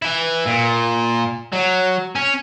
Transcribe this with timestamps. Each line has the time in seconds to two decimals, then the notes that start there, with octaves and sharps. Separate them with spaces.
0.02 E3 E4
0.47 A#2
1.53 F#3
2.15 C#4